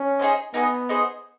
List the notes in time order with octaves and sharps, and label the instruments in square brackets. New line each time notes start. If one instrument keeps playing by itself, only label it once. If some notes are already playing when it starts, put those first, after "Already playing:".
Already playing: [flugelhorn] C#4
[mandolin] D#4 G#4 C5 D#5
[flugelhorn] B3 [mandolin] D#4 G#4 C5 D#5
[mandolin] D#4 G#4 C5 D#5